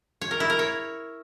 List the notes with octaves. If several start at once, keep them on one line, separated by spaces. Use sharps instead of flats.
C#5
A#4
E4
A#4
C#5